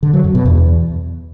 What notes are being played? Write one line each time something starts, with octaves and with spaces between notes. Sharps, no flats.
D3
F#3
F#2
B2
E2